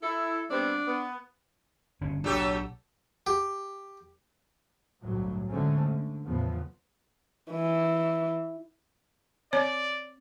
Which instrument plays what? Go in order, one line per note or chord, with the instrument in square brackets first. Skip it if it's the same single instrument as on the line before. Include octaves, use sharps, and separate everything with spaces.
[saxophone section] E4 [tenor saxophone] A4
[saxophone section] G3 B3 C4 [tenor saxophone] D4
[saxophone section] B3
[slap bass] G1 C#3 C#4
[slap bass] B1 D4 [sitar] F#3 G4 A4
[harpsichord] G4
[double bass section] G1 C2 A2 F#3
B2 D3 G#3 A3 C4 C#4
D3
E2 A2 C#3 F3 B3
[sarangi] E3
[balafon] C4 C#5 [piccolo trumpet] D5